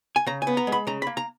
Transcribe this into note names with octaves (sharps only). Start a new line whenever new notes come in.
G#5
C#3 A#5
G#5
B3
A#5
G#3
B5
C#3 A#5
A#3 B5
A#5